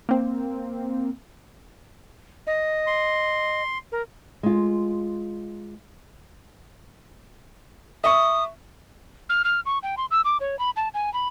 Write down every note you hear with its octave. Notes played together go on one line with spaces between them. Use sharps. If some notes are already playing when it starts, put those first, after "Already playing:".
A#3 C4
D#5
C6
A#4
G#3 F4
E5 C#6 D#6
F6
F6
C#6
G5
C6
E6
D6
C#5
B5
A5
G#5
B5